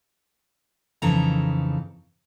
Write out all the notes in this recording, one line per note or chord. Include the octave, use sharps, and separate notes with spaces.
F2 C#3 E3 D#4 A4 A#5